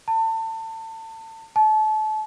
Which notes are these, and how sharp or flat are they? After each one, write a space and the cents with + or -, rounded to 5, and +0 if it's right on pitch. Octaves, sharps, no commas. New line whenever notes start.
A5 +30
A5 -30